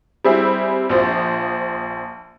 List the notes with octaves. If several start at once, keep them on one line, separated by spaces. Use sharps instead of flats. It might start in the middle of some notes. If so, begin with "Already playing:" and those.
G3 C4 E4 G#4
A#1 F3 C5